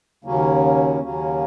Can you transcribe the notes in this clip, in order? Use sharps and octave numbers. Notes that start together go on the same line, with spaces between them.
D#2 C#3 F#3 A#3 C#4
D#2 C#3 F#3 A#3 C#4